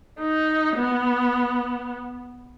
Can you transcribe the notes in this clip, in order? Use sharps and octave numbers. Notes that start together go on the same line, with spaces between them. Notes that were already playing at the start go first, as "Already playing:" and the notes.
D#4
B3